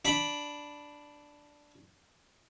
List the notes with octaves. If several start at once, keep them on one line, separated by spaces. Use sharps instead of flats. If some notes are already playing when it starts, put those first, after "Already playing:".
D4 B5